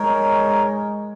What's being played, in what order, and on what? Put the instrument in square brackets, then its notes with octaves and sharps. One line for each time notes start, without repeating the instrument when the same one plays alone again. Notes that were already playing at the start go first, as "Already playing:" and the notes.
Already playing: [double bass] G#3 [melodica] D#4 A#4 C#5